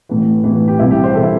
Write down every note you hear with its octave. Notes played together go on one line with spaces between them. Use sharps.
A1 A2 E3
A1 A2 E3
G4
C2 C3 E3 E4
G4
C5
C3 E3 A4
E4